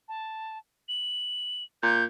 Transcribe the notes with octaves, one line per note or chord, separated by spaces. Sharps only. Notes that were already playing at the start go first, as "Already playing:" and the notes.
A5
F#7
A#2 G6